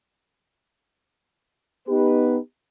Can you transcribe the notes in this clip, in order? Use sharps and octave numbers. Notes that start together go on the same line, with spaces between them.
B3 D#4 G4 B4